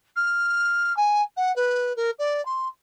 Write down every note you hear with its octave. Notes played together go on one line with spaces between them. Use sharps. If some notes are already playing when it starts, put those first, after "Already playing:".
F6
G#5
F#5
B4
A#4
D5
C6